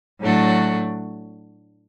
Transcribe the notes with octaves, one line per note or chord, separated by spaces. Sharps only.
A2 F#3 A3 D4 F#4